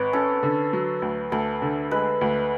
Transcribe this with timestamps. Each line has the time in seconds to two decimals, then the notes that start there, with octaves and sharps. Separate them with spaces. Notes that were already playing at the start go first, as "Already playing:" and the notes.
Already playing: G#1 B4 C#5
0.13 C#4 A4
0.43 D3
0.73 F#3
1.02 D2
1.32 D2 A4
1.62 D3
1.91 G#3 B4
2.21 D2